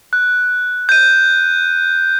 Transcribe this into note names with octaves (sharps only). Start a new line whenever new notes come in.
F#6
G6 D#7